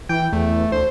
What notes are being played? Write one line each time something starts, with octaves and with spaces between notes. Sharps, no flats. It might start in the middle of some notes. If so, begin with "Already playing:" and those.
E3 G5
E2 A3
D2 C5